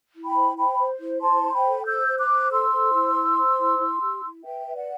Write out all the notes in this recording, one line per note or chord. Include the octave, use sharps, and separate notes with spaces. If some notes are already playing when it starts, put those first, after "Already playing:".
E4
G5 B5
C5
C5 G5 B5
C5
E4
C5 A5 C6
C5
C6
G5 B5
A4
C5 E6 G6
C5
D6 F#6
C5
A4 C6 E6
C5
E4
C5
C5
E4
E4
G4
E4
B4 E5 G5
B4
D5 F#5